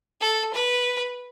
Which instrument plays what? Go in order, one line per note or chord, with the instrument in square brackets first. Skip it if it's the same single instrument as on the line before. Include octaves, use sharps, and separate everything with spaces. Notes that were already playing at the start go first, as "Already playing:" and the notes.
[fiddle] A4
B4